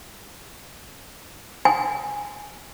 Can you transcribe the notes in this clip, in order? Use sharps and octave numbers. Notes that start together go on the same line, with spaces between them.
G#5